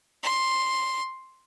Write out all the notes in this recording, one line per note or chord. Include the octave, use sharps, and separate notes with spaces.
C6